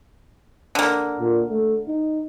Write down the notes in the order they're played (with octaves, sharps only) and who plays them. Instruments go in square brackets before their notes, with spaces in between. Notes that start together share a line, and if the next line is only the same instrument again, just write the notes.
[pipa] D3 A#3
[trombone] A#2
A3
D#4